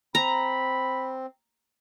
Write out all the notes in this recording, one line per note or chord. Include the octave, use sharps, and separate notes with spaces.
C4 A#5 B5